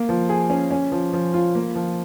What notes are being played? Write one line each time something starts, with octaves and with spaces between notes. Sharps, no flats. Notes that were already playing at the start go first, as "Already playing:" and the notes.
Already playing: A#3
F3
G#4
C#4
C#4
F3
F3
F4
A#3
F3